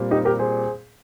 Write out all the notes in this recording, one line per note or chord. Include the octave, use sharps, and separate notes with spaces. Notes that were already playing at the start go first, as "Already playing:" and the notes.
Already playing: A#2 G3 C4
D#4 G4
G4 A#4
G#4 C5